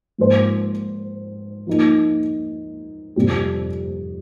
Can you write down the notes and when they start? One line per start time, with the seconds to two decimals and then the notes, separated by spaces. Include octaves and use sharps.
0.18 G#2 F3 A#3 F4 C5
1.67 F3 A#3 D#4
3.16 F2 C3 G3 C4 G4